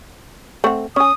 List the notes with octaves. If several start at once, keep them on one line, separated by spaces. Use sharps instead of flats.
A3 C4 F#5
C#4 G#5 D#6